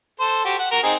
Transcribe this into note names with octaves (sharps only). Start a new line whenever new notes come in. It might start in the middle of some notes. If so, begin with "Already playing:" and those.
A4 C5
F#4 G4
F#5
F#4 A#4
C4 D#4 G#4